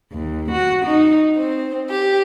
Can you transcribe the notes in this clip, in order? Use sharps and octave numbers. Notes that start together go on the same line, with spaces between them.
D#2
F#4
D#4
C4
G4